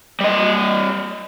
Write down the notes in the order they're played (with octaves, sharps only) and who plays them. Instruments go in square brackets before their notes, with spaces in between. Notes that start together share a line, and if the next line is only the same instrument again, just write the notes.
[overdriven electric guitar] G3 D#5